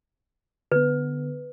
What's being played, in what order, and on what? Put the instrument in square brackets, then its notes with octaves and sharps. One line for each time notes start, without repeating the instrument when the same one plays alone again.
[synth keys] D3 B3 [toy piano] B4